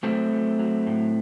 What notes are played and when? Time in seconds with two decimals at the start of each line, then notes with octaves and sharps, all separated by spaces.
0.03 F#3 A3 C4
0.32 F#3
0.59 F#3
0.87 A2